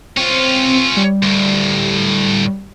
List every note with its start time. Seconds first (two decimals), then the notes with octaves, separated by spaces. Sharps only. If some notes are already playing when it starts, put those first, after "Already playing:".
0.17 C4 C#4 F4
0.97 G3
1.23 D2 A2